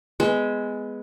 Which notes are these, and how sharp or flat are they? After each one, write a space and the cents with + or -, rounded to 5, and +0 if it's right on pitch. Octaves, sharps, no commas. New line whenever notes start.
G#3 +0 B3 +10 E5 -30